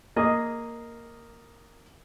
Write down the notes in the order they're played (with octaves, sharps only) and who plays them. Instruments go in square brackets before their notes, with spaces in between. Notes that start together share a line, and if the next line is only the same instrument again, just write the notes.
[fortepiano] A#3 G#4 D#5